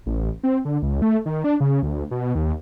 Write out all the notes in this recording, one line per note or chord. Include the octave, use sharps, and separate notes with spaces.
A1
C4
D3
C#2
A3
D#3
D4
C#3
D2
B2
D#2